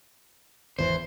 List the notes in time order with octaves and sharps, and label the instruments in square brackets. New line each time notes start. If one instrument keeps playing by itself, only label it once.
[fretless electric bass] G#1 E2 E3 [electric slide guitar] C5